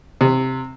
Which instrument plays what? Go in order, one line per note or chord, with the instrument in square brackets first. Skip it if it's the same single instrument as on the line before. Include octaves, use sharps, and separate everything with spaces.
[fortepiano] C3